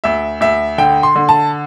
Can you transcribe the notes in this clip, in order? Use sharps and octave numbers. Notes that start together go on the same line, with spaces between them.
D2 E5
D2 E5
D3 G5
C6
D3
A5